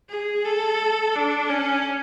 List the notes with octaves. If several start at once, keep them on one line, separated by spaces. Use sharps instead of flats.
G#4
A4
D4
C#4